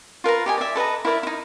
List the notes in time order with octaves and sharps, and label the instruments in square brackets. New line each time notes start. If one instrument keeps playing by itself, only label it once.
[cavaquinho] F4 A#4 B4 A#5
G4 D#5 G#5
D5 E5
A4 B4 D#5 A#5
E4 A#4 D5 E5
D#4 E4